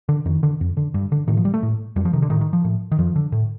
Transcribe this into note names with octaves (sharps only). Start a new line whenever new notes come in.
D3
F2 D#3
D3
F2
D3
G2
D3
A2 D#3
F3
G3
A3
A2
F2 G3
F3
C3 D#3
D3
A2 D#3
D#3
F3
A2
D#3
F2 F3
D3
A2